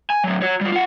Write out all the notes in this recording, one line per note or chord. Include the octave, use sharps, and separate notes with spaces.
G#5
A2 F#3
F#4 C#5
G3 F4
F4 F#5